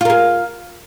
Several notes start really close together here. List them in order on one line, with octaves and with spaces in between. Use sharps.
F4 A#4 G#4